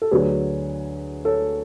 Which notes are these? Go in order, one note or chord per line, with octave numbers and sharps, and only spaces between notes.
A4
D2 D3 F#3 G#4 B4
A4 C#5